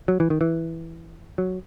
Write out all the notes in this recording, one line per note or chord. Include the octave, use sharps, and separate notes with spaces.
F#3
E3
D#3
E3
F#3